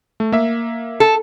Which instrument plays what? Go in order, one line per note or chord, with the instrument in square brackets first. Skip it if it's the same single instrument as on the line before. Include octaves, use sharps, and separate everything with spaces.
[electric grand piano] A3
A#3 E5
[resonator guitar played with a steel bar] A4